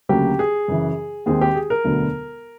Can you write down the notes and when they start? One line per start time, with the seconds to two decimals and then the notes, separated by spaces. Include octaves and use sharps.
0.09 D2 C#3 F#3 A#3 G4
0.39 G#4
0.68 F#2 C#3 E3
1.26 D#2 D#3 G#3 C4 G#4
1.41 G4
1.55 G#4
1.70 A#4
1.84 E1 D2 D3 F#3 B3